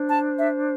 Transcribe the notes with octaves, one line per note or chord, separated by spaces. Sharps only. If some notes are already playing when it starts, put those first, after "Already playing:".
Already playing: D4 C5
A5
E5